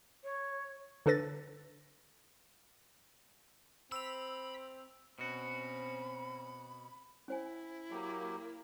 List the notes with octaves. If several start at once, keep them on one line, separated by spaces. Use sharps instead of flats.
C#5
D3 D4 A4 B4 A6 A#6
C4 B5 E6 F7
B2 C4 C#4 F#4 B5
C#4 E4 C5 G#5
F#3 A#3 G4